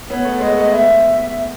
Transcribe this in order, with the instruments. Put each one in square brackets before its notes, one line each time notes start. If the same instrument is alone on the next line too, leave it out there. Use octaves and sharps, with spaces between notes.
[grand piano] B3 [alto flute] C#5
[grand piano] A3
[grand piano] G#3 [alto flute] D#5
[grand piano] A3 [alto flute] D#5
[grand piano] B3 [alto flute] E5